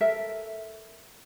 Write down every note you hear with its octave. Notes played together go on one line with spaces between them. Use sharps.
A4 A#4 E5